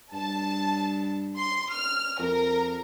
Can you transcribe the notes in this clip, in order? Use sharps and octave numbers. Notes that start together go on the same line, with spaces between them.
G2 A5
C6
F6
F2 A#4